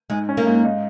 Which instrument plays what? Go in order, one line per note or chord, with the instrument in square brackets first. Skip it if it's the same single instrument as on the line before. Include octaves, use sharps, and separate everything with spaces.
[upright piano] G#2 [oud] G#3
[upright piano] C#4
[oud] A#3
[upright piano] G#2
D#4